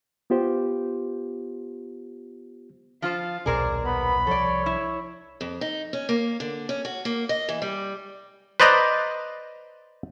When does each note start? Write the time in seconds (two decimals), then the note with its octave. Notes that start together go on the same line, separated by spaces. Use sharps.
0.30 B3 F4 G4 C5
3.02 F3 F4 C5 F5
3.46 D#1 B1 B2 G#4 A#4 C5 D5
3.85 B3 B5
4.27 C2 F3 A4 C#5 D5
4.66 E4
5.41 F2
5.61 D#4
5.93 C#4
6.09 A#3
6.40 D3
6.69 C#4
6.85 F#4
7.05 A#3
7.29 D#5
7.49 E3
7.62 G3
8.60 B4 C5 D5 D#5 A#5